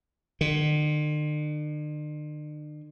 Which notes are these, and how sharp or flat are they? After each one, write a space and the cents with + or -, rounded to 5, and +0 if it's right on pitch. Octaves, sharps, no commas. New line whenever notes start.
D3 +45